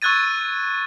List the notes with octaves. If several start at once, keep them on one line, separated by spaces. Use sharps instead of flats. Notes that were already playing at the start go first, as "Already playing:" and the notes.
C#6 E6 F#6 G#6 A6 D#7